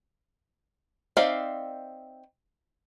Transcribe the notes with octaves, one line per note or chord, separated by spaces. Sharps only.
C4 D#4 D5 E5 F5